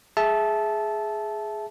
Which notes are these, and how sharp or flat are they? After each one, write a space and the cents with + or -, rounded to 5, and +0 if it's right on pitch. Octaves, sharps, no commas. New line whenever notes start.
G#4 +10 E5 +0 A5 -15